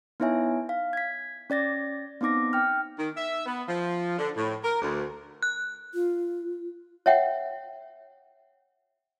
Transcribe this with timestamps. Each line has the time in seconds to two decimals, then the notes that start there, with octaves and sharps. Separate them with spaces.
0.20 B3 D#4 E4 C#5 E5 G#5
0.69 F5
0.93 G#6 B6
1.50 C#4 D5 A6 A#6
2.21 B3 C4 D#4 D6 A#6
2.53 G5 F6
2.97 D#3
3.16 E5
3.46 B3
3.67 F3
4.19 D3
4.35 A2
4.63 A#4
4.82 D2
5.43 F#6
5.94 F4
7.06 C#5 E5 F#5 G5